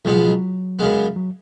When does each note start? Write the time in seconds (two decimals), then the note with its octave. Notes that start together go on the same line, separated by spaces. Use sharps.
0.05 C#2 B2 F#3 G#3 B3
0.16 F3
0.28 F#3
0.79 F#2 C#3 G#3 B3
1.16 F#3